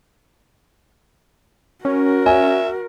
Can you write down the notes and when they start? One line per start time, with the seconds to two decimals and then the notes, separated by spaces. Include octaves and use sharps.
1.85 C#4 F#4 A#4
2.26 E5 G#5